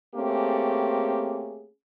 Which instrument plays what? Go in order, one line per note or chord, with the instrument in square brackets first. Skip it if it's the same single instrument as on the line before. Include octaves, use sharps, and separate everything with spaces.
[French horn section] A3 A#3 C4 C#4 G4 G#4